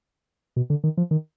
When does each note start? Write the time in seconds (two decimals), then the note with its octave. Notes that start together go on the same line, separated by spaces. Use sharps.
0.56 B2
0.70 D3
0.84 D#3
0.97 F3
1.11 D#3